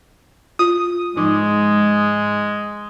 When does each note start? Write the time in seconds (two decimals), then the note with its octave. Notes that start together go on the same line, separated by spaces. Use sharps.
0.59 F4 D#6
1.17 G#2 F3 G#3 D#4 D6